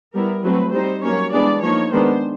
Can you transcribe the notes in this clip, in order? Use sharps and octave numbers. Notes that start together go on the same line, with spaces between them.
G3 B3 E4 A#4
F#3 A3 C4 B4
G3 C4 D#4 C5
F#3 A#3 C#4 C#5
E3 G#3 B3 D4 D5
F3 A#3 D#4 C#5
D#3 G#3 B3 D4 C5